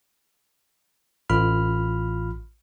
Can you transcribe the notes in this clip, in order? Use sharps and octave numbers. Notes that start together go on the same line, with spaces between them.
A1 F4 B5 F6